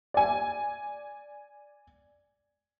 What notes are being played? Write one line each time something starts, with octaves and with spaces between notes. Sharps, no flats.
D5 G#5